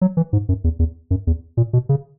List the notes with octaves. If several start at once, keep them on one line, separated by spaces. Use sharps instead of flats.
F#3
E3
G#2
F#2
E2
E2
F#2
E2
A#2
B2
C#3